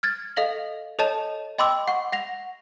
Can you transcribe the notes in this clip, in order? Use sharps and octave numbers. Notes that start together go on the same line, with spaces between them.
F6 G#6 A6
A4 D#5 F5 A#6 F#7
A4 C#5 D#5 A5 E7
D#5 G5 B5 C6 D6 E6
F#5 C#6
F#5 A#6 F7